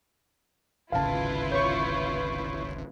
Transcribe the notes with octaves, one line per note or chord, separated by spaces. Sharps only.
D1 G#1 C#3 E4 F4 B4 F5 A5
C#5 C#6 G6